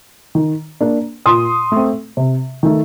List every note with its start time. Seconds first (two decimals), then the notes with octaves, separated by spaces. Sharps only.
0.35 D#3
0.81 A#3 D4
1.26 A#2 C6 D#6
1.72 A3 C4
2.17 C3
2.63 D#3 A3